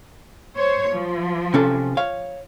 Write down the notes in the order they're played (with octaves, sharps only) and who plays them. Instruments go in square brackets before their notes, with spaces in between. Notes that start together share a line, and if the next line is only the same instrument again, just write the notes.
[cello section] C5 C#5
F3
[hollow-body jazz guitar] C3 C#4 A4
C#5 F5